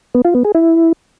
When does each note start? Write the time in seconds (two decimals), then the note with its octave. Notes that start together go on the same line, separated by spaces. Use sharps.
0.15 B3
0.25 F4
0.35 B3
0.45 G#4
0.55 E4